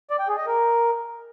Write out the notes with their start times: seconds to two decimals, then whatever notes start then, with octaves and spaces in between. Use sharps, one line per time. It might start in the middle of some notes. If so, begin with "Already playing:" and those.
0.11 D5
0.20 G5
0.29 G#4
0.38 D#5
0.47 A#4